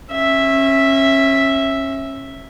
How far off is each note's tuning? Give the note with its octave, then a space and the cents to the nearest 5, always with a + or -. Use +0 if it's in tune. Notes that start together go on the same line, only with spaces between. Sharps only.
C#4 -30 E5 +0